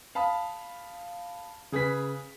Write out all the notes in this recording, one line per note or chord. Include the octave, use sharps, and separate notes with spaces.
F5 A5 B5 D#6
C#3 G#4 B4 B6